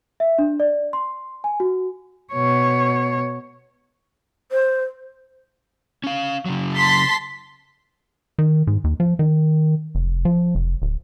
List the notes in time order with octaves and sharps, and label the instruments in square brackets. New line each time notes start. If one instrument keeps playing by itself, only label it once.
[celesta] E5
D4
D5
C6
G#5
F#4
[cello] B2 C#5
[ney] C5
[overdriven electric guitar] C#4 F5
C#3 F#3
[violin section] A5 C6 B6
[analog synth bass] D#3
G#2
D#2
F3
D#3
F1
F3
F1
D1